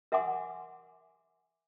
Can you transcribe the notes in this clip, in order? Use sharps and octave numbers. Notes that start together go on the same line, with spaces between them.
A#4 E5 F#5 G#5 C6 D6